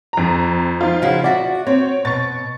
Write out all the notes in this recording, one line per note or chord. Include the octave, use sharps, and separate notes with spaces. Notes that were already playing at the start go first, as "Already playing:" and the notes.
F2 A#5
F3 D#4 F4
C#3 E4 F#4
F#4 D5 E5 F#5
C4 C#5
B2 C#6 A6